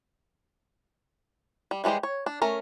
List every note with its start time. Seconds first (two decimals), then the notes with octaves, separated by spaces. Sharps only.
1.71 G3
1.84 E3 G3 G#3 G4 C5
2.03 C#5
2.26 D4
2.42 A3 C#4 A#4